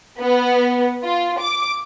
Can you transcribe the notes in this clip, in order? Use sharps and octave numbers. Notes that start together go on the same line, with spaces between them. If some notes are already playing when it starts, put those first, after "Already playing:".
B3
F4
D6